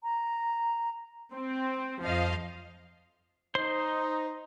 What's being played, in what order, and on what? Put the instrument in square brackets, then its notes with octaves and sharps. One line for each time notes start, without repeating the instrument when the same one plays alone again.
[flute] A#5
[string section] C4
F2 F3 D#5 F5
[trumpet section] D#4 [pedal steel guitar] C5 C6